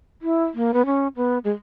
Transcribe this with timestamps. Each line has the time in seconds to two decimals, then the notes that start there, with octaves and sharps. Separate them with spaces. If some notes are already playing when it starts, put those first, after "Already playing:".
0.22 E4
0.55 A#3
0.74 B3
0.86 C#4
1.16 B3
1.44 G#3